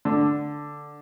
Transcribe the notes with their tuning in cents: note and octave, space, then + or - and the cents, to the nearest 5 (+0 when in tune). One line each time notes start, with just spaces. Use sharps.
D3 +0